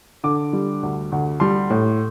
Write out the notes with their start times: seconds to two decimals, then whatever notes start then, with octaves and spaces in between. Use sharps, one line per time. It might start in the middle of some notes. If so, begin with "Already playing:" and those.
0.24 D3 D6
0.53 G3
0.83 D2
1.12 D2
1.40 G3 C6
1.70 A2